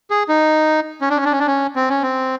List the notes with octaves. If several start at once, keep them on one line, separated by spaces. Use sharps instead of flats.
G#4
D#4
C#4
D4
C#4
D4
C#4
D4
C#4
C4
C#4
C4